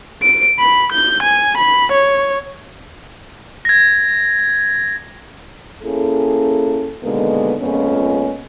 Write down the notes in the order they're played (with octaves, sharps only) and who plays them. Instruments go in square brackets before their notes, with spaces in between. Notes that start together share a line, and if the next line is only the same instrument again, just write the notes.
[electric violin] D7
B5
G6
G#5
B5
C#5
[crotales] G#6 A#6
[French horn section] A#3 C#4 E4 G#4 A4
B2 D3 D#3 G#3 A#3 B3
F2 A#2 G#3 B3 C#4